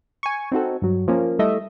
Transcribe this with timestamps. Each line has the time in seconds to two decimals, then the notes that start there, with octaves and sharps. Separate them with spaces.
0.23 G#5 C#6
0.52 C4 D#4 F#4 A4
0.82 G2 F#3
1.08 F3 A#3 C#4
1.39 G3 A3 E4 D#5 E5